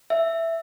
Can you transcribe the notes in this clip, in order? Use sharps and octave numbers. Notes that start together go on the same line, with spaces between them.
E5